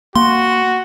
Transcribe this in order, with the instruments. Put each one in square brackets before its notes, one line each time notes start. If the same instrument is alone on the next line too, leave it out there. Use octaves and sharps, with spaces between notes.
[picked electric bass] A#3 [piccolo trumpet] F#4 [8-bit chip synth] C6